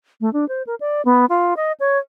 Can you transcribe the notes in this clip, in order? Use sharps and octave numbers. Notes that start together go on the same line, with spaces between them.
A3
D4
C5
A#4
D5
B3
F4
D#5
C#5